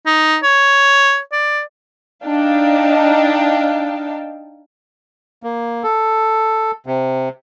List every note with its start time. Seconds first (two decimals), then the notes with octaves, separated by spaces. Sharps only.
0.06 D#4
0.43 C#5
1.32 D5
2.24 D4 D#4 F5 G5 A5
5.43 A#3
5.83 A4
6.86 C3